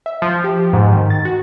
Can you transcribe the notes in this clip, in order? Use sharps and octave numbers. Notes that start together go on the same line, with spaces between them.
E5
F3
G4
G#2
D#3
A6
F#4